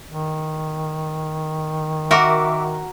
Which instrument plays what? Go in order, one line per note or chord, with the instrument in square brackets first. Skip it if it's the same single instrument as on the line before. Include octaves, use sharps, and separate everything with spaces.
[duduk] D#3
[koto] F#4 A#4 [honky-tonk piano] E5 D6